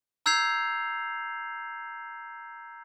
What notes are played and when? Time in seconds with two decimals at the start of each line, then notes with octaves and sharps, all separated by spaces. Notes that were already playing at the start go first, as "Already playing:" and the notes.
0.26 A#5 E6 G6 G#6 C7 F7